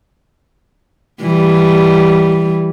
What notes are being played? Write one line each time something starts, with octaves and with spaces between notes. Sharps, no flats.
E3 G3